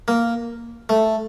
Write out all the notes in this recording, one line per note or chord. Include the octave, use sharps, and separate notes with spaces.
A#3
A3